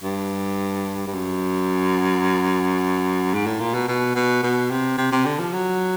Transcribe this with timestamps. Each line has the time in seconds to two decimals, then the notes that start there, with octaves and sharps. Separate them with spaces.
0.03 G2
1.07 G2
1.14 F#2
3.33 G#2
3.46 A2
3.60 A#2
3.74 B2
3.88 B2
4.15 B2
4.43 B2
4.71 C3
4.98 C3
5.12 C3
5.25 D3
5.39 F3
5.53 F#3